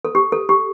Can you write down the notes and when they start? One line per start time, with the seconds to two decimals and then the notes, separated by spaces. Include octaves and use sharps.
0.05 A4
0.15 G4
0.32 A4
0.49 G4